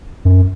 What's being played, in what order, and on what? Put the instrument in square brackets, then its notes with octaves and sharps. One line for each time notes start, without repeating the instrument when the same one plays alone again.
[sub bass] F#2